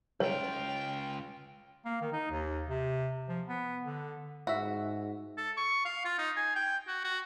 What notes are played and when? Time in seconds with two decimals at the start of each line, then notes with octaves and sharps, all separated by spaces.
0.20 C#2 F4 C#5 G5
1.85 A#3
2.01 D#3
2.12 D#4
2.31 D#2
2.67 C3
3.28 F3
3.48 B3
3.85 D3
4.47 G#2 F#4 E5
5.38 A4
5.57 C#6
5.85 F5
6.05 F4
6.18 D#4
6.37 G#5
6.56 G5
6.87 F#4
7.04 F#4